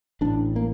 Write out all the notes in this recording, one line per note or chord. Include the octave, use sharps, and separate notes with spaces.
A1 A2 D4
A#3